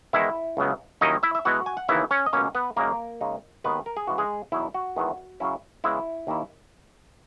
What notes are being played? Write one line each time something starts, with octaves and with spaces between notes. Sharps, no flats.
E2 D#3 G#3 D#4 E4 E5
C#2 C#3 F#3 B3
D#2 D#3 F#3 C#4 D#4 E4 D#5
E4 E5
E5
B2 G#3 B3 E4 F#4 F#5
G#5
F#5
D#2 C#3 E3 B3 D#4 E4 E5
C#4 C#5
D#5
C#2 B2 A#3 C#4 C#5
B3 B4
F#2 C#3 G#3 A#3 D#4 A#4
C#3 G#3 D#4
D#2 D#3 G#3 B3 B4
A#4
G#4
C#3 E3 G#3 C#4 F#4
G#3 G#4
E2 B2 F#3 B3 D#4 E4
F#4
E2 D#3 G#3 B3 E4
C#3 F#3 C#4 E4
C#3 G#3 B3 E4
D#2 D#3 A#3 E4